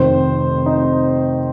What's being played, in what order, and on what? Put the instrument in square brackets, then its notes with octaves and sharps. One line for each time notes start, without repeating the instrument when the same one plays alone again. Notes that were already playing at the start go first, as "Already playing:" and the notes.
Already playing: [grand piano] F1 F2 D#3 C5
D#4